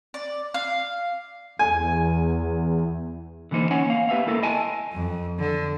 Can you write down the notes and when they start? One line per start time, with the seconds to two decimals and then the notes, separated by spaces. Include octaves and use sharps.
0.14 D5
0.54 F5
1.59 E2 G#5
3.51 D3 E3 A#3 D#4 C5
3.71 C#4 C#5 F#5 G#5
3.86 A#3 F5
4.09 B3 G4 B4 E5 F5
4.27 A#3 E4 A4 A#4
4.43 D#5 G#5 A5
4.93 F2
5.39 D3